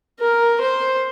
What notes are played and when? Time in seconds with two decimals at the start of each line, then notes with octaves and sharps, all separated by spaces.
0.20 A#4
0.61 C5